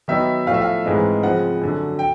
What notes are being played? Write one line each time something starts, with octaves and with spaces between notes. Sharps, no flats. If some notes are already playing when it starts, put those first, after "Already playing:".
D#3 F#3 B3 D#4 E5
A2 F3 A3 F5
E5
F5
G#2 E3 G#3 C4 D#4
C#3 F3 G#3 C4 F#5
F#2 D3 F#3
G5